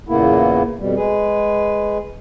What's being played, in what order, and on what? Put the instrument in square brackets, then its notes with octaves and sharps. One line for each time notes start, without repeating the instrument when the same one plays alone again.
[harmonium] E2 A#2 C#3 A#3 B3 E4
F2 B2 G3
G#3 G#4 B4